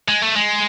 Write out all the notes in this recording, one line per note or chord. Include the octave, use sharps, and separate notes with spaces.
G#3
A3
G#3